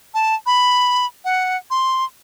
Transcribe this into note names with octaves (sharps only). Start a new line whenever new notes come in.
A5
B5
F#5
C6